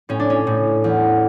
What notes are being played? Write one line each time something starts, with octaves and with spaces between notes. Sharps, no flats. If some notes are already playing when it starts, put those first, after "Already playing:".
A2 C#4
D4
C#4
A2
E2